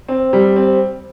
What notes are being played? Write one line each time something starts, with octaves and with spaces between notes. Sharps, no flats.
C4
G3
C4